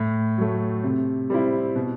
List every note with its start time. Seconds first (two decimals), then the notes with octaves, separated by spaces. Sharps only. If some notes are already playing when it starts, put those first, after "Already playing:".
Already playing: A2
0.38 F#3 A3
0.84 C3
1.30 G3 C4 E4
1.76 B2